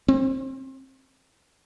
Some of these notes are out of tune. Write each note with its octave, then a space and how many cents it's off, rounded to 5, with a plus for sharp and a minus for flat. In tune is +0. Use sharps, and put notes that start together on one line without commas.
C4 +30